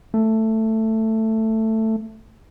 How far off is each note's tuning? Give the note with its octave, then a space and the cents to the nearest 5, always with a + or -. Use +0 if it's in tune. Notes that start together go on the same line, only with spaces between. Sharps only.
A3 +10